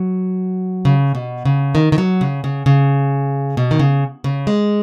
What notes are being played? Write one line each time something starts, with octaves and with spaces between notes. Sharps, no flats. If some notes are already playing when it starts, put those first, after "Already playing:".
Already playing: F#3
C#3
B2
C#3
D#3
D#3
F#3
C#3
C#3
C#3
B2
D#3
C#3
C#3
G#3